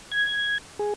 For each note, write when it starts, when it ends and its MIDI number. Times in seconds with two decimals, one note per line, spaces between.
0.12 0.58 92
0.79 0.94 68